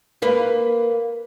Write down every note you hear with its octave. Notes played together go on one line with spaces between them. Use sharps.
A#3 B4 F5